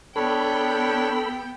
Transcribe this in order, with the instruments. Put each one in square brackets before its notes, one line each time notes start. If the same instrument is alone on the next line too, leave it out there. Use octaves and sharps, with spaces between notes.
[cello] B3 G5 [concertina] D4 C#5 [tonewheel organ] A4 B5